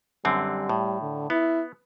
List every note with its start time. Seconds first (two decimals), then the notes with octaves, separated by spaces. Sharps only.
0.25 F#2 D3 G3 C4
0.69 A2
1.01 D3
1.30 B3 E4